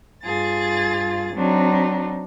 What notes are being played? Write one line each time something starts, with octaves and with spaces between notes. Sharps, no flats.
G2 F4 G#4 A6
F#3 C4 D4 D#4